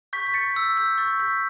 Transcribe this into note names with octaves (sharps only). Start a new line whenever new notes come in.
C#6 G6 B6
B6
A6 C#7
E6 G6
G6
C#6 A6
G6 B6